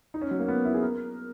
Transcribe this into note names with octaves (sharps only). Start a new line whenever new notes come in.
D#4
C#4
F#3
A#3
B3
E4
G#4
A#4